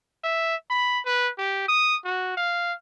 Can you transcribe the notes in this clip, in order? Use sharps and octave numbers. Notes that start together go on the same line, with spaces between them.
E5
B5
B4
G4
D#6
F#4
F5